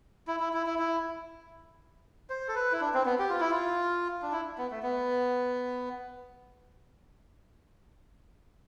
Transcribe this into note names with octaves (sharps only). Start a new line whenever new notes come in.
E4
E4
E4
E4
E4
C5
A4
B4
E4
D4
C4
B3
G4
F4
E4
F4
D4
E4
B3
A3
B3